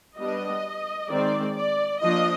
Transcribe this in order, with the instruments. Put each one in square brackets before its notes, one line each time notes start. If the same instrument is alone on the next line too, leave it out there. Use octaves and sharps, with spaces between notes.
[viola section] G3 B3 D4 D#5
D#3 G#3 C4 D5
D5
F3 A#3 D4 D#5